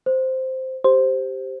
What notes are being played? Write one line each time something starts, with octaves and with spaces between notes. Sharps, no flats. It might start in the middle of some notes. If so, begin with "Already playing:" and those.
C5
G4 C5